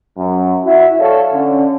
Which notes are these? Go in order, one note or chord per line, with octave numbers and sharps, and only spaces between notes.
F#2
E4 F#4 E5
A4 C#5 D5 F5
D3 C#4